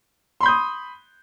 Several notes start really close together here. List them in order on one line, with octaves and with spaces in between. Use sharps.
C6 B5 G6 D#6